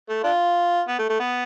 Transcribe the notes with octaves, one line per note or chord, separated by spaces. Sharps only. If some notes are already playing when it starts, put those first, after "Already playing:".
A3
D4 F4
B3
A3
A3
B3